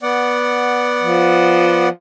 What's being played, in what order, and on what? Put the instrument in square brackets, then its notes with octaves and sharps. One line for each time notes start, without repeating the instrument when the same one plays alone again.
[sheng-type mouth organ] B3 D5 F#5
[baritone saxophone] F3